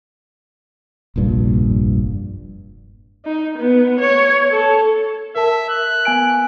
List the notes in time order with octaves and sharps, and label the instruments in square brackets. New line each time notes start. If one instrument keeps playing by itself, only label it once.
[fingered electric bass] F1 A#1 G2 A#2
[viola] D#4
B3
C#5
A4
[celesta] A#4 A5 [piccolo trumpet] E5
[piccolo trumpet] F#6
[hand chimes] B3 G#5 D7